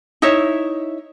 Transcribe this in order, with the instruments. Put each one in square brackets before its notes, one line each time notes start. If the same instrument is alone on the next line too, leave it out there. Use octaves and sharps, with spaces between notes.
[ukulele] D#4 E4 C#5 E5